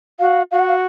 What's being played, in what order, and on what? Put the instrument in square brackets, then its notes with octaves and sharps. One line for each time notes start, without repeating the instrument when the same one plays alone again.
[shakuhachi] F#4 [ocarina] F5
[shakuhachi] F#4 [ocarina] F5
[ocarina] F#5
F5